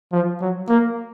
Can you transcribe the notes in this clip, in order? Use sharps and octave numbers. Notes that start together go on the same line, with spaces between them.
F3
F#3
A#3